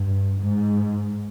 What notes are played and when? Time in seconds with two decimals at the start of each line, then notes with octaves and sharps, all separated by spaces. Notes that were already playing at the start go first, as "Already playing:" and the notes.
Already playing: G2
0.40 G#2